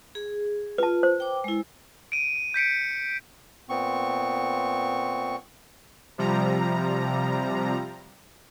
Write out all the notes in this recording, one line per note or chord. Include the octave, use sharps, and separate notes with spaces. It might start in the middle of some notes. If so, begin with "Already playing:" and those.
G#4
F4 B4 A5
C5
G5 D6
G#3 E4
D7 D#7
G6 B6 C#7 D7
A#2 B3 C4 C#6
C3 F3 G3 A#5